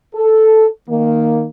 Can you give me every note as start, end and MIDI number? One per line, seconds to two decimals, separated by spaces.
0.15 0.66 69
0.88 1.45 51
0.88 1.45 58